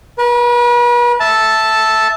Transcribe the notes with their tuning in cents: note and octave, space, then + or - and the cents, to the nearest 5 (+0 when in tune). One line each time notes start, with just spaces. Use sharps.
B4 -40 A#5 +0
E5 -5 A5 +0